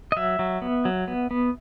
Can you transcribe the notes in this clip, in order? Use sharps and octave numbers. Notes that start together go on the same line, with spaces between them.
D#5
F#3 E5
F#3
B3
F#3
B3
B3